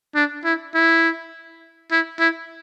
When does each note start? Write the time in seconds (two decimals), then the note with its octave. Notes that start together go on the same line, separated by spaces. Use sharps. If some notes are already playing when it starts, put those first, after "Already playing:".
0.15 D4
0.45 E4
0.75 E4
1.91 E4
2.19 E4